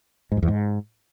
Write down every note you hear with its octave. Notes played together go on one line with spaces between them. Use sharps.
G#2
F#2
E2
G#2